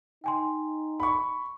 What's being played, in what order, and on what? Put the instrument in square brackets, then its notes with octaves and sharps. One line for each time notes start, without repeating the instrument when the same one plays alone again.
[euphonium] D#4 [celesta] G5 G#5 C6
[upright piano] B5 C#6